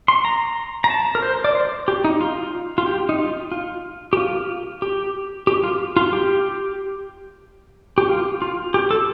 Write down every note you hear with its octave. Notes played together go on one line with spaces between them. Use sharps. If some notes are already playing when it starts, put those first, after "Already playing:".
C6
A#5
A#5
A5
A#4
C5
D5
C5
G4
D#4
F4
F4
G4
D#4
F4
F4
G4
F4
G4
G4
F4
F4
G4
G4
F4
F4
G4
A4